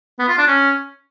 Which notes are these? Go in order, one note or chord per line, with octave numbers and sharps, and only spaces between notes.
B3
F4
D4
C#4